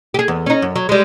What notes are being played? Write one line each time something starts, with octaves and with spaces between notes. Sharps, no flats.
G4 G#4
E2
C#4 D#4
F#2
F#3
G3 G#3